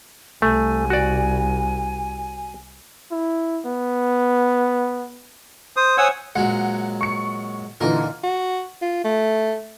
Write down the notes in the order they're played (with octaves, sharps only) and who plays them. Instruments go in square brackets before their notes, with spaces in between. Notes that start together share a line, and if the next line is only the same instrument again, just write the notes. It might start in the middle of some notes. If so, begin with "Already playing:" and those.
[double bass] C2 [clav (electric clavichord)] A3 [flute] G#5
[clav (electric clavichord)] F#4 D5
[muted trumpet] E4
B3
[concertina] C5 D#6
[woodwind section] C5 C#5 G#5 [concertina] F#5 D#6 E6
[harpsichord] A#1 F#3 G#3 [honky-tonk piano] F#5
[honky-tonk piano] C#6 C#7
[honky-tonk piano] A#2 D3 E3 [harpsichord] D#4 A#4
[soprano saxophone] F#4
F4
A3